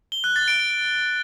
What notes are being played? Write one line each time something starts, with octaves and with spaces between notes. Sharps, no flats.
G7
F#6
A6
D7
D7